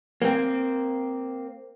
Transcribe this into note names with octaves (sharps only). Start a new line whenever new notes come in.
A#3 C4